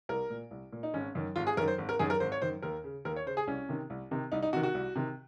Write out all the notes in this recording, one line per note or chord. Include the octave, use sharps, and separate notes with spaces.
C2 A#4
A#2
C2
A#2
D#4
G#1 C#4
F#2 D#3
G#1 F4
G#4
F#2 D#3 A#4
C5
G#1
A#4
F#2 D#3 G#4
A#4
G#1 C5
C#5
F#2 D#3 C5
D#2 A#4
C#3
D#2 A#4
C#5
C#3 C5
G#4
C2 C#4
C3 D#3
C2
C3 D#3
C2 D#4
D#4
C3 D#3 F#4
F#4
C2
C3 D#3